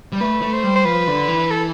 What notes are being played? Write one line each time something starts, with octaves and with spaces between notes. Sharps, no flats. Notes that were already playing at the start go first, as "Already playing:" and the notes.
G3
A3 B4
A3
C5
G3
C5
F3 B4
D3
E3
A4